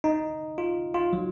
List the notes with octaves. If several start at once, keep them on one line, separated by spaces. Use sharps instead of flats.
D#4
F4
F4
F#3